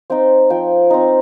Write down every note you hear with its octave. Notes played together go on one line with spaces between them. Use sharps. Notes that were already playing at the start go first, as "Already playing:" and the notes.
C4 D#4 G5
F3 G5
C4 D#4